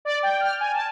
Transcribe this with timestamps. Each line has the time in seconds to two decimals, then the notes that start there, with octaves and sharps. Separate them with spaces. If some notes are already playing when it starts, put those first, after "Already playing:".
0.05 D5
0.23 G5
0.41 F6
0.60 G#5
0.74 A5